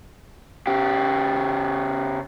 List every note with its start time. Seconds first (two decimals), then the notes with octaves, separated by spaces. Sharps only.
0.67 C#3 G4